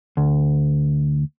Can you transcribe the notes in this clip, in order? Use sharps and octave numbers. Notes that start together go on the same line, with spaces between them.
D2